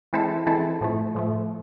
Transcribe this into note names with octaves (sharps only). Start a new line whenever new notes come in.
E3 G#3 C4 E4 A4
E3 G#3 C4 E4 A4
A2 F3 A3
A2 F3 A3